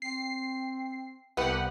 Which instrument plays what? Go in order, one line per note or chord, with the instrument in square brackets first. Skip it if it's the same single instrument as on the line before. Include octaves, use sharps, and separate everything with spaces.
[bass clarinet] C4 [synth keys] C7
[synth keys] C2 G4 F#5 [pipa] B3